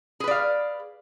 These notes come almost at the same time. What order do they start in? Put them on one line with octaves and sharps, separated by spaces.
G#4 B4 D5 F5